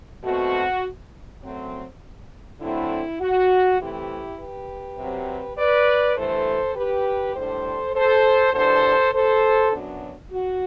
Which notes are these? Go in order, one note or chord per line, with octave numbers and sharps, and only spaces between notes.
B2 A3 C4 F#4
F#2 F#3 A3 C4
D3 F#3 A3 C4 E4
F#4
C3 E3 A3 C4 E4 G4
G4 B4
C3 F#3 C4
B4 D5
G2 E3 A3 A4 C5
G4 B4
A2 G3 D4 A4 C5
A4 C5
E2 B2 G3 D4 A4 C5
A4 C5
F#2 F#3 B3 D4
F#4